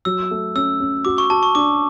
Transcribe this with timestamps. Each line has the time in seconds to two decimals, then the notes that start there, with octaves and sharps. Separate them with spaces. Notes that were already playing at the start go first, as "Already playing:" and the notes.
0.05 F#3 E6
0.31 A3
0.55 C#4 E6
0.80 C#4
1.05 F#4 D6
1.18 C#6
1.30 F#4 A5
1.43 C#6
1.55 D4 D6